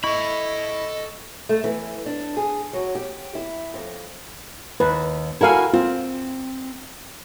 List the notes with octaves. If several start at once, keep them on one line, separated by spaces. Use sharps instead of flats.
E4 A4 D#5 B5 C#6
A3
E3
D4
G#4
F#3
G4
E4
F2
D#2 B4
E4 F#4 A4 A#4 F5 G#5
C4 F4